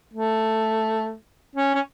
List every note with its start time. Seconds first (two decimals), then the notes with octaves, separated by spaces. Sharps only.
0.14 A3
1.55 C#4
1.75 C#4